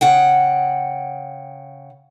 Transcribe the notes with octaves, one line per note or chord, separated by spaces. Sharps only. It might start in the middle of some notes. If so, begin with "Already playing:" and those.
C#3 F#5 G5